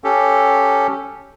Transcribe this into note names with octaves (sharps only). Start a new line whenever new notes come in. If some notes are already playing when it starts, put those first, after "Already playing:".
C#4 G4 A4